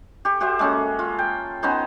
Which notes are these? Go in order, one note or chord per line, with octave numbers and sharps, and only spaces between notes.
G4 C#6
F#4 G4 C5 E5
G#3 A#3 C#4 A4
F4
G5
B3 C#4 D#4 C5